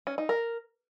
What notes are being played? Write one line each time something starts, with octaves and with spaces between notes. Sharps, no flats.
C#4
D#4
A#4